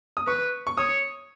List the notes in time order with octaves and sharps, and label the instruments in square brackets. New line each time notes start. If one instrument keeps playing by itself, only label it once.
[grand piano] D#6
[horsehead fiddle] B4 [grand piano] C#6
[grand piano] C#6
[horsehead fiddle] C#5 [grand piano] D#6